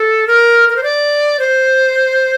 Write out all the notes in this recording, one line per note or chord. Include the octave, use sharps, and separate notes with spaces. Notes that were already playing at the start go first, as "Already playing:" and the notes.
Already playing: A4
A#4
A#4
C5
D5
C5